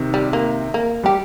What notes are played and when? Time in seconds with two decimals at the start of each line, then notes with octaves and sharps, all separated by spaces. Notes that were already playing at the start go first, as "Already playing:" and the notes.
Already playing: C3 D#3
0.14 G3
0.33 A#3
0.74 A#3
1.03 G3 G4